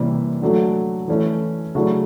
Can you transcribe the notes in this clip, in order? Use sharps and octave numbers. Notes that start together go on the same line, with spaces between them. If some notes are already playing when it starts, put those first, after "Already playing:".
Already playing: C3 E3 G3 A#3 C#4
D3 F#3 A3
E3 A3 C#4 E4
C#3 F#3 A3 D4 F#4